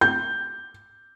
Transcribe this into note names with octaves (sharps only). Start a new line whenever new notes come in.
G6